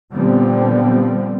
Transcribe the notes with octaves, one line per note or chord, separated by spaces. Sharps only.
A#2 D3 F3 G3 B3 C4